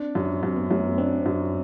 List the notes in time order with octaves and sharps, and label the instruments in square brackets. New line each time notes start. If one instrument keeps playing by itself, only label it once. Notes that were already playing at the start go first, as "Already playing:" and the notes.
Already playing: [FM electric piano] C4 [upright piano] D4
[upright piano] F#2
[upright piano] F#2 [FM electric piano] C4
[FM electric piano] B3
[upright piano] F#2 [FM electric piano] A3
[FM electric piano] B3
[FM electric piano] C4 [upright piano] D4
[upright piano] F#2